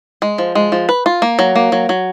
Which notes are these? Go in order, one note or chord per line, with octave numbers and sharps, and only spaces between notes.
G#3
F3
G#3
F3
B4
F4
A#3
F#3
A#3
F#3
F#3